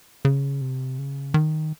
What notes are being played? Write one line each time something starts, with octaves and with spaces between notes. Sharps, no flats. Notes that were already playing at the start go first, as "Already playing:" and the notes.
C#3
C3
C#3
D#3